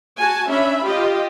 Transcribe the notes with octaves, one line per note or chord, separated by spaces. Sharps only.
F#4 G#5 A5
C#4 D4 E5 B5
F4 G4 D#5